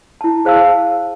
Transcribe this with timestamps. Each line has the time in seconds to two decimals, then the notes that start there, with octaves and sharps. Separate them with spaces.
0.21 E4 A5
0.45 G#4 C5 F5 A5 E6